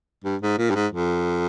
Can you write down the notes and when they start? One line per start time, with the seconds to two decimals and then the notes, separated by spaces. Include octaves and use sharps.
0.24 G2
0.42 G#2
0.58 A#2
0.70 G2
0.75 G#2
0.92 F2